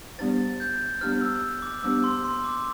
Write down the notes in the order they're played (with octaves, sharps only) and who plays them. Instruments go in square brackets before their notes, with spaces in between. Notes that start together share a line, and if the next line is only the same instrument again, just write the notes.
[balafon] G3 B3 D4 G4 C5 [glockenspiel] A6
[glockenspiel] G6
[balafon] G3 B3 D4 G4 C5 [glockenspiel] F6
[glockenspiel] E6
D6
[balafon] G3 B3 D4 G4 C5 [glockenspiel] E6
[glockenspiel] C6
C6
D6